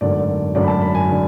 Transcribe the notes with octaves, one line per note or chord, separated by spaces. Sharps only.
G#1 F#2 D3 A3 D5
G#1 F#2 D3 A3 D5
B5
A5
B5
G#5
D3